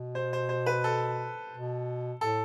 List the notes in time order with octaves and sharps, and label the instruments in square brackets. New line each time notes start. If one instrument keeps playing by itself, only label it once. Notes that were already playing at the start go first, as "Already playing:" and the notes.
Already playing: [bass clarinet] B2
[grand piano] C5
C5
C5
B4
A4
[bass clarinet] B2
[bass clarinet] A2 [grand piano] A4